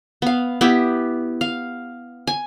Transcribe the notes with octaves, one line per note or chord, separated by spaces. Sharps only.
B3 F5
B3 E4 G4
F5
G#5